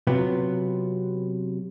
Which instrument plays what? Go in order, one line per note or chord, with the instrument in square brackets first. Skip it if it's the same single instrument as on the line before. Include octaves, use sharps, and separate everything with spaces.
[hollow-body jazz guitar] C3 F#3 B3 F4